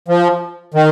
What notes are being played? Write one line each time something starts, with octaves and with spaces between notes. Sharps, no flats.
F3
D#3